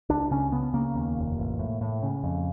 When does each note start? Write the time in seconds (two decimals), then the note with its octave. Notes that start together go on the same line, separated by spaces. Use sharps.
0.10 C#2 D4
0.31 C#3 C#4
0.52 C#3 B3
0.74 C#3 A#3
0.95 D#2
1.17 F1
1.38 A1
1.59 A2
1.81 A2
2.03 C#3
2.24 F2